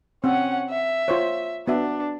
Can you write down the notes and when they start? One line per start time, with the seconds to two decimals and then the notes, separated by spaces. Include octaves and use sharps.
0.24 C4 C#4 F#5
0.70 E5
1.08 F4 C5 C#5
1.67 B3 D4 F#4 E5